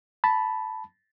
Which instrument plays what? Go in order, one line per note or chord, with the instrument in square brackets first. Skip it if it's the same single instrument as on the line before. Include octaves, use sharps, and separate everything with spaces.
[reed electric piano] A5 B5